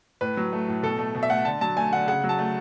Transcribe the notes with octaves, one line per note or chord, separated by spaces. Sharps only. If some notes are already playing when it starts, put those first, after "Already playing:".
A2 B4
F#3
A3
A2
B2 A4
A3
B2
E5
A3 F#5
D3 A5
F#3 A5
A3 G#5
D3 F#5
C#3 F#5
F#3
A5
A3